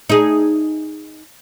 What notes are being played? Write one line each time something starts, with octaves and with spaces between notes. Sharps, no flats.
D#4 G#4